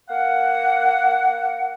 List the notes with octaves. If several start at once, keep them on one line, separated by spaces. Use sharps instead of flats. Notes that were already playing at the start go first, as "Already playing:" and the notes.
A#3 F5 F#5